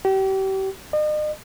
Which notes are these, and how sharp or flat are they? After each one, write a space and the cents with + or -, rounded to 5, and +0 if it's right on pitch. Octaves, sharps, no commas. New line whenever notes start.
G4 -35
D#5 -40